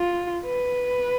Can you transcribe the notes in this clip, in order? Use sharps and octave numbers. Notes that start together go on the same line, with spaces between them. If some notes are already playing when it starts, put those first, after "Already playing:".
Already playing: F4
B4